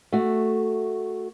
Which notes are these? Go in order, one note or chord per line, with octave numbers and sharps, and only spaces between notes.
A3 F#4